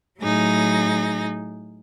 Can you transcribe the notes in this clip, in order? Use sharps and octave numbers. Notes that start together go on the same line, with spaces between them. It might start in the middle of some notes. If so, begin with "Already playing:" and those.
A2 F#3 D#4 G#4 A#6